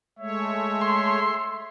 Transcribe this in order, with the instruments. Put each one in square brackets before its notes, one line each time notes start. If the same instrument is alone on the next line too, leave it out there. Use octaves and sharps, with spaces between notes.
[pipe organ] G#3 A3 C#5 [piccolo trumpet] E5
[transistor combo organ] C6